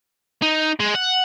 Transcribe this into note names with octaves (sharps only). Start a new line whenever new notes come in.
D#4
G#3
F#5